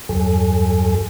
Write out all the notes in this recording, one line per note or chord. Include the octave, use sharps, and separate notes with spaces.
E2 G2 F#3 A4 G#5